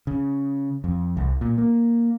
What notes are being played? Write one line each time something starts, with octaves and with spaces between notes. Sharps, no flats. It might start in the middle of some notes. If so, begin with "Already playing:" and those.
C#3
F2
C2
A#2
A#3